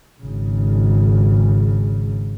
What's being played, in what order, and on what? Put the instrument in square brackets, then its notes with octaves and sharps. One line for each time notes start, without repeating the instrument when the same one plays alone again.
[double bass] G#1 C#3